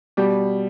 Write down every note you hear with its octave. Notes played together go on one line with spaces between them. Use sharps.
B2 G3 G4